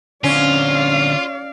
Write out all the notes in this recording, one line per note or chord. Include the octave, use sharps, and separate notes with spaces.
D3 C4 C#4 F4 D5 F5